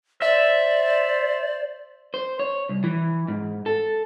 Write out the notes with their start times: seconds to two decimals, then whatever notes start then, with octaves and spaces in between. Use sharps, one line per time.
0.22 C5 D5 E5
2.14 C5
2.39 C#5
2.69 C2
2.84 E3
3.28 G#2
3.66 A4